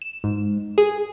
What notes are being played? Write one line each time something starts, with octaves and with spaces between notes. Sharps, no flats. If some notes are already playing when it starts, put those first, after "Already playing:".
E7
G#2
G#4